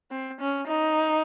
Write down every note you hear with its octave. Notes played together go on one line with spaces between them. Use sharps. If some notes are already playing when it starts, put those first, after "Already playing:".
C4
C#4
D#4